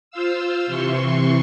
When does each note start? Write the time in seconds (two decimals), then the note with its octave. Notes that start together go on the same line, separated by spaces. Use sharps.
0.11 F4 C5 F5 E6
0.66 C3 E3 C6 C#6